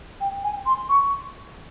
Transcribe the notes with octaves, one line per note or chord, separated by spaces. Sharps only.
G5
G#5
C6
C#6